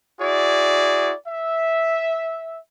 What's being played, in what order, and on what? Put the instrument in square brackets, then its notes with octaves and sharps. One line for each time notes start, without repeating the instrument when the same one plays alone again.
[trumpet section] E4 F#4 G#4 D5
E5